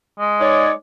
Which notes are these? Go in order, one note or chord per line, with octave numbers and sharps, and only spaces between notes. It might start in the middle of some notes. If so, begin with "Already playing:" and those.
G#3
D#4 C#5 D5